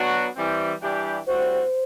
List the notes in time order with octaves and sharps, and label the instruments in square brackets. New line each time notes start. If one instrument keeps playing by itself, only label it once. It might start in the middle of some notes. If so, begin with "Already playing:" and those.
Already playing: [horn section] F#3 B3 D4 F#4
E3 G3 C4
E3 G3 D4 G4
[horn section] A2 G3 C4 F#4 [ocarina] C5